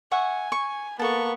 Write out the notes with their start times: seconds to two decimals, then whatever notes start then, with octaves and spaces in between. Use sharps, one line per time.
0.11 E5 F#5 G#5 C#6
0.52 C#6
0.99 A#3 B3 A4 A5 C#6